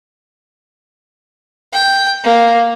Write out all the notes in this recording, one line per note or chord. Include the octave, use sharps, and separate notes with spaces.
G5
A#3